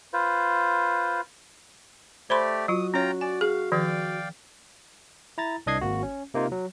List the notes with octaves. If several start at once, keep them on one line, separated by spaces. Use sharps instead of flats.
F4 B4 C5
A3 G4 C5 D5 B5 C6
F#3 F4 F#4 D#6
C#4 F4 C#5 G5 A#5
D5 G#5
G#4 F5
D#3 F3 D5 F5 G5
E4 A#5 A6
C2 D4 D#5 D#6 G#6 C7
G#1 A#3 F#4
C#4
C3 A#3 D#4 F4
F#3